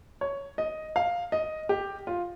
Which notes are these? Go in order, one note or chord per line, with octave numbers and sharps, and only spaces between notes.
C#5
D#5
F5
D#5
G4
F4